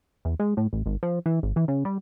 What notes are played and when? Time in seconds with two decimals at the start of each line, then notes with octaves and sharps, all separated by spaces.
0.25 E2
0.40 G#3
0.57 A2
0.73 A1
0.86 G#1
1.03 F3
1.26 E3
1.43 G#1
1.56 E3
1.68 C#3
1.85 G3